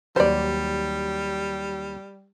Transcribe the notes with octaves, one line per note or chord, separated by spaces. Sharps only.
D#2 F#3 G3 C5 D5